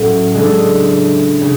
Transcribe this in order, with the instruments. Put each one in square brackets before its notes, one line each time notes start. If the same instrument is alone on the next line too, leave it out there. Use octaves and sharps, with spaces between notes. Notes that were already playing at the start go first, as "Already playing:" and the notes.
Already playing: [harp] A2 F#3 C#4
C#3 G#3 D4 A4
C#3